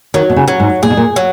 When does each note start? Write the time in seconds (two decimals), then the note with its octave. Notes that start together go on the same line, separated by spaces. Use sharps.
0.14 D#3 F#3
0.30 B2
0.36 C#3
0.48 F#3
0.60 G#2
0.83 A#2 G#4
0.90 B2
0.97 A#2
1.16 F#3